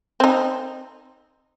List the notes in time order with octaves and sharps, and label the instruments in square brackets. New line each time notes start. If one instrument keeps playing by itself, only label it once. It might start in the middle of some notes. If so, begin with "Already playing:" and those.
[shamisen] C4 D#4